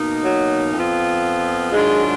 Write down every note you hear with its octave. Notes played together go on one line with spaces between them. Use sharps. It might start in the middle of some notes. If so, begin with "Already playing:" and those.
Already playing: B2 A#3 D#4
F#3
F2 F3 B3 F4
G#2 D#3 F#3 G#3 D4 F4